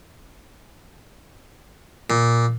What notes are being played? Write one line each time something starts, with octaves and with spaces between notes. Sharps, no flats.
A#2